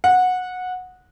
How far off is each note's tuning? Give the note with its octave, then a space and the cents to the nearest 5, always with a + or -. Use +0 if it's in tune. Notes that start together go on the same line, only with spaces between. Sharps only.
F#5 -15